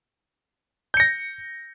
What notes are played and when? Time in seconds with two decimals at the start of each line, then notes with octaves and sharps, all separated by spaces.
0.94 G6
0.97 C#7
1.00 A#6